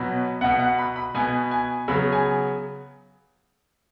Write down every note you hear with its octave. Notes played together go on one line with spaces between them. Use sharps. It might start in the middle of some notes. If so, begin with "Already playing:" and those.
Already playing: B2 F#3 B3
B2 B3 F#5
F#5
B5
B5
B2 B3 G#5
G#5
C#3 F#3 B3 B5
G#5